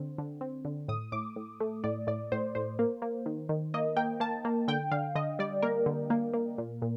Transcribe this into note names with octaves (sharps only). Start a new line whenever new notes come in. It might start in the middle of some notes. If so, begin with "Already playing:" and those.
Already playing: D3 C4
D3
C4
D3
A2 D#6
A2 D6
A2
A3
A2 D5
A2 D5
A2 C5
A2 C5
A#3
A#3
D#3
D#3
A#3 D#5
A#3 G5
A#3 A5
A#3
D3 G5
D3 F5
D3 D#5
G3 D5
A#3 A#4
D3
A#3
A#3
A#2
A#2